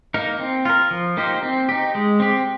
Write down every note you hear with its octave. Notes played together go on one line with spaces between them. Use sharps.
A#3 D#4 A#4
C4
F4 A#4
F3
A#3 D#4 G4 C5
C4
D#4 G4
G#3
C4 G4